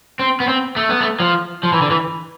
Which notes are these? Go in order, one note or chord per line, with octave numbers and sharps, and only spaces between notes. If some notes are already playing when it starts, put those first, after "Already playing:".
C4
B3
C4
A3
B3
A3
F3
F3
E3
D3
E3